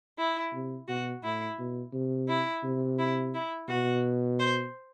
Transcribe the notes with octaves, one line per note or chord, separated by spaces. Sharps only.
E4
C3
B2 F#4
A2 E4
B2
C3
E4
C3
E4
E4
B2 F#4
C5